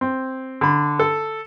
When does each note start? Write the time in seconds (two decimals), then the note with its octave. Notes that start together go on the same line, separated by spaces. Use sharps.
0.01 C4
0.61 D3 B5
0.99 A4